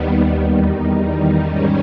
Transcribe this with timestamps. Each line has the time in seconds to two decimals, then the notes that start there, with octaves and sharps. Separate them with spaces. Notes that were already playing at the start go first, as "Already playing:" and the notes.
Already playing: D#2 D#3 G3 B3
0.50 E2 D#3 G3 D#4
1.40 G#2 D#3 G3 C#4